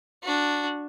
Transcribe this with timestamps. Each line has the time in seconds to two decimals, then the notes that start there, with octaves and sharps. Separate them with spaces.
0.23 D4 F#4